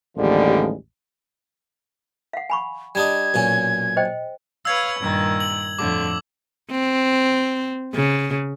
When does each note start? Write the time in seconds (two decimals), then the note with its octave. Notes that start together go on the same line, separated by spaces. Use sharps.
0.17 A1 D#2 D3 F3 G3 G#3
2.33 F5 F#5
2.50 G#5 B5 C#6
2.95 G3 D4 D#4 G#6
3.34 B1 A#2 C#4
3.97 C5 D#5 G5
4.65 B4 C#5 F5 E6 G#6
5.00 G2 A#2 D#3
5.40 F#7
5.79 F2 A2 D3 D6
6.71 C4
7.94 C#3